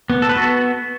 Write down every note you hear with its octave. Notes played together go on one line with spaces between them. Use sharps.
B3
A4
B4
B3 F#4 A4